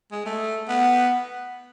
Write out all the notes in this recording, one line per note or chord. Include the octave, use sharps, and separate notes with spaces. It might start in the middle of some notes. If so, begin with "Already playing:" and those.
G#3
A3
B3